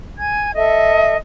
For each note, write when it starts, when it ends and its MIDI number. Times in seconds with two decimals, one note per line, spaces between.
0.18 0.50 80
0.18 0.50 92
0.54 1.16 69
0.54 1.16 75
0.54 1.16 76